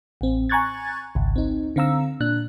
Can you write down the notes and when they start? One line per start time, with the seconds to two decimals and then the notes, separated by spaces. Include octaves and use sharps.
0.21 A1 C4
0.49 G#5 A#5 C#6 F#6 G#6 A6
1.15 G#1 C#2
1.36 C4 D#4
1.76 D3 C4 F5 A#5 E6
2.20 A#2 D4 F#6